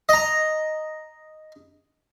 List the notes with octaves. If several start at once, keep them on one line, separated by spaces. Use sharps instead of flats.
D#5 A#5